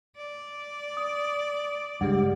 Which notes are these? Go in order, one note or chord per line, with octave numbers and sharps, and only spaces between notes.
D5
D#6
C#2 G2 G#3 G4 F#5